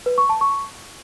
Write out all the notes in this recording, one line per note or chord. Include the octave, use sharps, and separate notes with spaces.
B4
C#6
A5
C#6